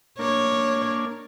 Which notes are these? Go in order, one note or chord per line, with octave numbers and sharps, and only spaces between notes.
A#3 D4 C#5